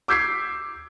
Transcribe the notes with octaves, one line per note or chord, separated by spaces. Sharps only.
D6 E6 G6 G#6 B6 C7